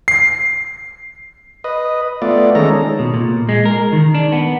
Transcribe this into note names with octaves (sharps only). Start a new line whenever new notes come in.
C7
B4 D#5
A3 B3 F4 D5
D#3 G#3 C#4 A4 A#5
B2
A#2
G#3
A#4
D#3
D4
B3